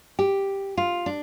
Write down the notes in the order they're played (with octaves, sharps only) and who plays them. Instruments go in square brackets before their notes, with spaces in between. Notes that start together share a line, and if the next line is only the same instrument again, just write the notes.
[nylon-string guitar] G4
F4
D4